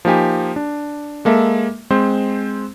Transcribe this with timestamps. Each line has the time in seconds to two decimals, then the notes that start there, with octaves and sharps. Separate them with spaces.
0.05 F3 A#3 D#4 G4 G#5
0.56 D4
1.25 G#3 A#3 A4 E5
1.90 G#3 C4 C5